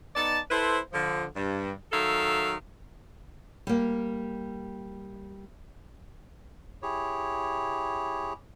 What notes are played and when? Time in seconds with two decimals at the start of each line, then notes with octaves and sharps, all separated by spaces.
0.15 B3 D#4 D5 A5
0.51 E4 A4 B4 C5
0.92 D3 F3
1.35 G2
1.92 D#3 F#3 A4 E5 F5
3.67 G3 A#3
6.82 E4 G4 G#4 C#5